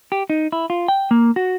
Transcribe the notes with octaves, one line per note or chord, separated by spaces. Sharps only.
G4
D#4
E4
F4
G5
A#3
F#4